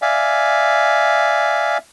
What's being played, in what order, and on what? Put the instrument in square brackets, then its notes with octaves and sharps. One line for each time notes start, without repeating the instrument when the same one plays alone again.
[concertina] D5 E5 F5 G#5